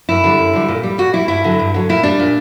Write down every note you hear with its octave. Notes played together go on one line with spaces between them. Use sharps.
F#2 E4
D3 G3
F#2
D3 G3
A#2
G3
A#2 F#4
G3 E4
G2 E4
D3 F#3
G2
D3 F#3
A#2 E4
G3 D4
A#2